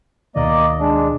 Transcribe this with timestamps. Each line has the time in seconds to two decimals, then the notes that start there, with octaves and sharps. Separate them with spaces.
0.36 D2 B2 D#3 A#3 D5 D#5
0.80 G#3 D4